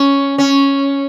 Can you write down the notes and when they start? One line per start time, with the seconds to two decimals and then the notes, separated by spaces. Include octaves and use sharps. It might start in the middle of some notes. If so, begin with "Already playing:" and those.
Already playing: C#4
0.38 C#4